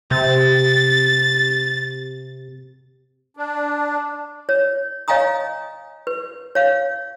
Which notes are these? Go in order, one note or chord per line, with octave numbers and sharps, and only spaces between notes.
C3 A6
D4
C#5
C#5 D#5 F5 G#5 A#5 D#6
B4
C#5 F5